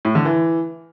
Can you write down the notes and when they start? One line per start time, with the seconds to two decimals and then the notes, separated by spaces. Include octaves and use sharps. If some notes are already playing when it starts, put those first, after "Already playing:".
0.05 A2
0.15 D3
0.25 E3